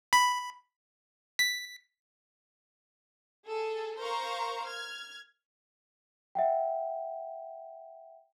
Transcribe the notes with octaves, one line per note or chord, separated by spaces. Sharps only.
B5
B6
G#4 A4
A#4 C5 F5 A#5 C#6
F6 G#6
E5 F#5 G5